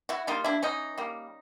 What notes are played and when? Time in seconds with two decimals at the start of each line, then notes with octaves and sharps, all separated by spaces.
0.09 E4 F#4
0.27 G3 A#3 D#4 F4
0.44 D4 E4
0.63 E3 C#4 D#4
0.98 G3 A#3